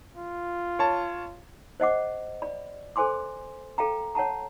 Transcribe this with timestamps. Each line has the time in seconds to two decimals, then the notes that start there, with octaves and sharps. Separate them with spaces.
0.16 F4
0.79 C#5 A5
1.80 C5 D#5 F#5 D6
2.42 D5 B5
2.96 A4 C5 G#5 C6 D6
3.78 A4 F5 G5 A#5
4.15 C#5 F#5 A5 A#5